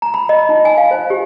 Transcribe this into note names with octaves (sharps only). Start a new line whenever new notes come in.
A#5
B5
D#5
D#4
G#5
F5
C5
G4